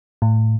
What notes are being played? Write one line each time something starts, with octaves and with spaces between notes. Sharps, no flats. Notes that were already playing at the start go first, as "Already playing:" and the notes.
A2